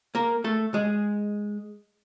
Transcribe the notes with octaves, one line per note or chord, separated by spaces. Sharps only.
A#3 A#4
A3 A4
G#3 G#4